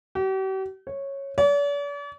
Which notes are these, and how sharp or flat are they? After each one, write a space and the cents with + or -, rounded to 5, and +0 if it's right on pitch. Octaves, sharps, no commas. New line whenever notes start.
G4 -45
C#5 -10
D5 -45